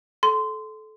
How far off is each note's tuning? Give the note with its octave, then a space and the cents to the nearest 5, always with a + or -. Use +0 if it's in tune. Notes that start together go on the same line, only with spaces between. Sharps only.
A4 -25 C6 -15